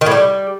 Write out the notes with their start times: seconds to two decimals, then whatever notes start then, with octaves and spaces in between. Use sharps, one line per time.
0.01 D#3
0.06 A2
0.11 G3